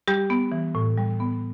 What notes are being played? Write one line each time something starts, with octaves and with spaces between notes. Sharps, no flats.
G3 G4
B3
E3
A2
G3
B3